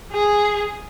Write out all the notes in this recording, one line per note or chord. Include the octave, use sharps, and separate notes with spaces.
G#4